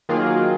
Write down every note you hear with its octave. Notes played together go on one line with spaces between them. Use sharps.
D#3 F#3 A#3 F4 G#4